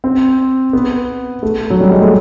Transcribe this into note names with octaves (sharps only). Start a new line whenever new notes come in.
C4
B3
A3
F#3
G3
G#3
A3